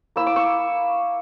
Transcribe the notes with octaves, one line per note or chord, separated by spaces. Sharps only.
A#3 E4 E6
D6
C#6 E6